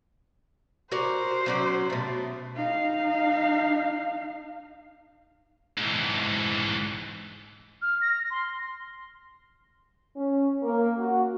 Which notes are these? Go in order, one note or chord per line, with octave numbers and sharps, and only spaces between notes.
F#4 A#4 C5 D5
F#3 C#4 D5
B2 A3
D#4 F5
G#2 E3
F6
A#6
C6
C#4
A#3
F#4